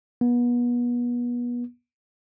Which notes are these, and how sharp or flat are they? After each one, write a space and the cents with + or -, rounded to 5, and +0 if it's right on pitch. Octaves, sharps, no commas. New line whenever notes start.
B3 -30